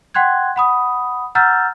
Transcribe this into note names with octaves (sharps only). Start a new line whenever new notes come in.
F#5 G5 C6 F#6 G#6
F#5 B5 D#6
F#5 A#5 E6 F6 G6 A6